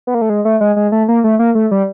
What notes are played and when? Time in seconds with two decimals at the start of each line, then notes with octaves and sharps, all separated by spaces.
0.07 B3
0.15 A#3
0.22 A3
0.30 G#3
0.45 A3
0.61 G#3
0.76 G#3
0.92 A3
1.08 A#3
1.24 A3
1.39 A#3
1.55 A3
1.71 G3